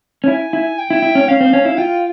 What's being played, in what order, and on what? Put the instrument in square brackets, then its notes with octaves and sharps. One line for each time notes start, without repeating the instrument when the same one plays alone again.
[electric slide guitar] C#4
[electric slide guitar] E4 [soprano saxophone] G#5
[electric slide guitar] E4
[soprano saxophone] G5
[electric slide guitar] E4
E4
C#4
[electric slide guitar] C#4 [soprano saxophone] F5
[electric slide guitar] C4
C#4
E4
[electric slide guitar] F4 [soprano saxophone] G5